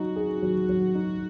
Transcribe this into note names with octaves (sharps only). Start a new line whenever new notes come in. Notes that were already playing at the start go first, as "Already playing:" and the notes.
Already playing: F#3 D#4 F#4
G#4
F#3
F#3
D#4